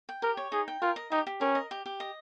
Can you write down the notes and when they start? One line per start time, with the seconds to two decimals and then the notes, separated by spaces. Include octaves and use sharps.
0.09 G5
0.22 G4 A#4
0.37 C#5
0.52 D#4 G#4
0.68 G5
0.82 F4 A#4
0.96 D#5
1.11 D#4 G4
1.27 G4
1.41 C#4 A#4
1.55 D#5
1.71 G4
1.86 G4
2.00 D#5